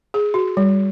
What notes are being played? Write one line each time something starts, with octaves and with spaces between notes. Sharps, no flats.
G#4
F#4
G3